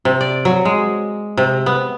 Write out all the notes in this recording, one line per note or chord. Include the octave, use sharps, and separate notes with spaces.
C3
D5
F#3
G#3
C3
B3